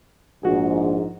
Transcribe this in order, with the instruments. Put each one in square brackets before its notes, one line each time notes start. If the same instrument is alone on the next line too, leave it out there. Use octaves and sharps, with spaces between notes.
[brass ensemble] A#1 G#2 [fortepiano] F#4 G#4